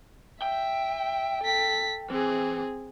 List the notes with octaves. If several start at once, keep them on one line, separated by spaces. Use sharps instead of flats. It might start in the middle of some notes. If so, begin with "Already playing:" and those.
E5 G5
A4 B6
E3 C4 G#4